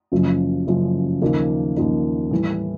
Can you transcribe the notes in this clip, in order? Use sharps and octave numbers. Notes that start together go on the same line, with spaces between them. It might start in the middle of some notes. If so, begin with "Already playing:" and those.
F#1 F#2 C#3 F3
F#1 F#2 C#3 F3
D#2 C#3 F3 A#3 D#4
D#2 C#3 F3 A#3 D#4
A2 E3 G3